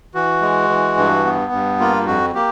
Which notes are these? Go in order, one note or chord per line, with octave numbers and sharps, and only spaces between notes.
E3 F#4
G#3
E3
G2
B3
G2
A#3 F4
F2 F#4
A#3 G4